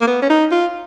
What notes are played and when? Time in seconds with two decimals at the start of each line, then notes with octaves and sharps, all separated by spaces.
0.01 A#3
0.07 B3
0.22 C#4
0.30 D#4
0.51 F4